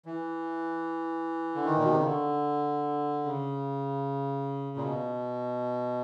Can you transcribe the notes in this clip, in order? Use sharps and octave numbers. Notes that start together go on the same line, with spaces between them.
E3
D3
D#3
A#2
B2
C3
C#3
D3
C#3
A#2
B2